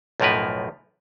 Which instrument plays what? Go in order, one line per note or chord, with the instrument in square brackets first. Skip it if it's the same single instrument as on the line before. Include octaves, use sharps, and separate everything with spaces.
[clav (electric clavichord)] B1 F#2 A2 F3 A#4 B4